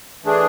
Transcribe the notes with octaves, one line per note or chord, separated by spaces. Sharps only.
E3 A3 D4 G#4